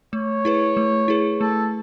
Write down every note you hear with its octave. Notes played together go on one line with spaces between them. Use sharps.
A3 C#5
E4 G#4 B4
A3
E4 G#4 B4
A3 A4